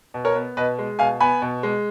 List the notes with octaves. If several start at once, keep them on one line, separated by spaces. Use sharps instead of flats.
B2
A#4 C#5
B3
B2 B4 D#5
G#3
B2 F5 G#5
B3 G#5 B5
B2
G#3